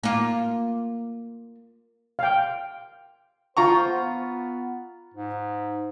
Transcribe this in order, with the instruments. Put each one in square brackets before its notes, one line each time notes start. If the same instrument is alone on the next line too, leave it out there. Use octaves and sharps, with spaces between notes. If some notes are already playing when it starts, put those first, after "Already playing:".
[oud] A#3 F4
[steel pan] F5 G5
[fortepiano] F4 A#5 C#6 [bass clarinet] C5
[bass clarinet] B3
G#2